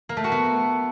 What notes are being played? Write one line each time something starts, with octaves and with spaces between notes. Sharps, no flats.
A#3
A3
F#4
B3